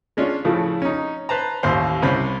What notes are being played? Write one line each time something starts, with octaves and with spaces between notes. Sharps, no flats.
G#3 C#4 D4 F4
A2 C#3 F3 A3
C#4 D#4
B4 C5 A5 A#5
A1 D#2 C5 C6
C2 C3 C#4 C5 B5